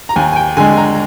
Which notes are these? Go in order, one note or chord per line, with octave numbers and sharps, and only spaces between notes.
A#5
D#2 G#5
G#5
G5
D3 G#3 G#5
A#5